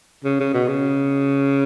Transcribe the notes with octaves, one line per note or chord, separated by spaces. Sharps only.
C#3
C#3
B2
C#3